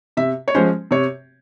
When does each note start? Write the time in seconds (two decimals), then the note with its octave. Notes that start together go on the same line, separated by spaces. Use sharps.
0.17 C3 E5
0.48 C#5
0.54 F3 G#3 C#4 C5
0.91 C3 C#5